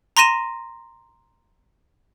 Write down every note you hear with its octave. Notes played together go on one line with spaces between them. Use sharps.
A#5 C6 A#6 D#7 E7